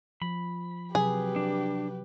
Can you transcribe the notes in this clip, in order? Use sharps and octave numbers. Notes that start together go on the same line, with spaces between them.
F3 B5
C3 F#3 G4 G#4 B4
D4